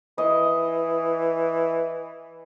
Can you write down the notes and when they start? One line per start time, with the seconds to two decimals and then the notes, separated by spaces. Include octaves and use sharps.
0.18 E3 D#5